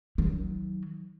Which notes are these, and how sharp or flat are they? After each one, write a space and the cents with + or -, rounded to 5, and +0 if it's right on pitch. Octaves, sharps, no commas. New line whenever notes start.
D#3 +35 F#3 +15